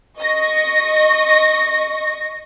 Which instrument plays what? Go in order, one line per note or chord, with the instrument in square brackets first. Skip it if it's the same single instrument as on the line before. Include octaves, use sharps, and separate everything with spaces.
[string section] D#5 C#6 A#6